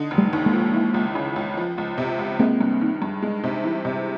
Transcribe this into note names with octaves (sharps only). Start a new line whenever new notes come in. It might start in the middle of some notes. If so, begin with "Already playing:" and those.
Already playing: D3 D#4
F1
G3 A3
D#2
G#3 A#3
F3
E3
C#2
C#3
C#2
F3
C#2
C3
C#2
G#3 A#3 C4
G2
D#3
G2
G#3
C3
E3
C3